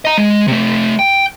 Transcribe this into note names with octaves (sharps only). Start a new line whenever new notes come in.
D#5 A#5
G#3
C3 A3
G5